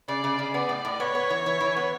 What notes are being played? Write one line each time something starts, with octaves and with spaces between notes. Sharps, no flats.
C#3 D5
C#3
C#3
B3 D5
A2
A2
B3 C#5
B3
E3
E3
E3
B3